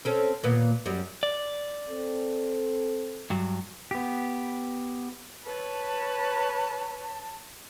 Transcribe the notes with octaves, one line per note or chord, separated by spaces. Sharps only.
C4 C#4 A4
D#2 A#2 B3
F#2 G3
D5
C4 A4
G2 F#3
B3 G4
B4 C#5 A5